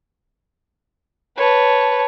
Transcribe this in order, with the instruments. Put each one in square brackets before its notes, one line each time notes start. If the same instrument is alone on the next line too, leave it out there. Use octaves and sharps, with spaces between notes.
[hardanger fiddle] B4 [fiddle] C#5 A5